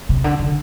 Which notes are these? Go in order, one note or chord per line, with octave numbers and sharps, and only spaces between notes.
C3
D3
D3